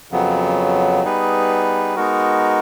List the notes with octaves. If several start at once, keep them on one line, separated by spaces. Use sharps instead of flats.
F2 C#3 F#3 B3
G3 B3 D#4 G#4 B4
G#3 B3 D#4 F#4 A#4